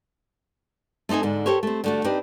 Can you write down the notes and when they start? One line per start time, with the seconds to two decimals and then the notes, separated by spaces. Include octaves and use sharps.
1.09 A3 C4 D#4 A4 G#5
1.23 G#2 D3
1.46 G4 A4 A#4 C5 C#5
1.63 A3 C4
1.84 D3 A3 F#4
2.04 C4 D4 D#4 G4 B4